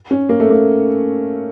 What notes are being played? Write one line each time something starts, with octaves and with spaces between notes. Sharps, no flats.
C#4
A#3
A3
A#3